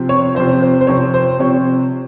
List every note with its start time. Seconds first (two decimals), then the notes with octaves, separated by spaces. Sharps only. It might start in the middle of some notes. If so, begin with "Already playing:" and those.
Already playing: C3 F3 C4
0.09 C#5
0.35 C3 F3 C4 C5
0.62 C5
0.81 C5
0.87 C3 F3 C4 C#5
1.14 C5
1.39 C3 F3 C4 C#5